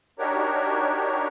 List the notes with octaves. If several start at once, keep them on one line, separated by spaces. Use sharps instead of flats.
D4 D#4 F#4 G4 A#4 C#5